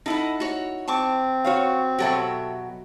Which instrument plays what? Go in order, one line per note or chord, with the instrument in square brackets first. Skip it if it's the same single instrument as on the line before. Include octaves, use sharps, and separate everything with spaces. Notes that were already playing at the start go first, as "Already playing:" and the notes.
[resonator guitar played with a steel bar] D#4 E4 [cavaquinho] A4 F#5
[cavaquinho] F#4 C#5
[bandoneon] C4 [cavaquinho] A5 C#6 D6
[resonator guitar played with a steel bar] F#4 C#5 F5
[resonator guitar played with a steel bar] B2 F#3 F#4 [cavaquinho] G4 A4 E5